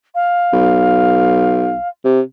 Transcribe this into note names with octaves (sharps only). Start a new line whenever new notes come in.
F5
B1
C3